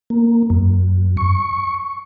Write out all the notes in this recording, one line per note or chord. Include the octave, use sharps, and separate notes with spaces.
A#3
F#2
C#6